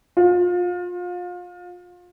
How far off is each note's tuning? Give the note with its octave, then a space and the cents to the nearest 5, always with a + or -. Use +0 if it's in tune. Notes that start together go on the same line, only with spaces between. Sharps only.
F4 +30